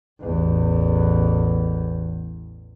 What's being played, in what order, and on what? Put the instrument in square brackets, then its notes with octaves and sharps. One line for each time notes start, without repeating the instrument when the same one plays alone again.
[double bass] A1 E2